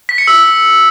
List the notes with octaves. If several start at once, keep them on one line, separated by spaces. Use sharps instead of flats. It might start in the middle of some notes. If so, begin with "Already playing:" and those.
B6
C#7
E6